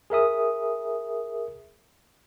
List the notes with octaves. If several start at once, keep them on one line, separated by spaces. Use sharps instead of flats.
G#4 A#4 E5 D#6